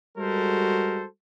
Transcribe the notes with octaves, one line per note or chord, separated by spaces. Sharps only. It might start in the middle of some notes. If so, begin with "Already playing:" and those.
G3 G#3 F#4 A4 A#4 C5